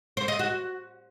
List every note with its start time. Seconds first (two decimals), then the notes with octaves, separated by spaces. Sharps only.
0.17 C5
0.28 D#5
0.39 F#4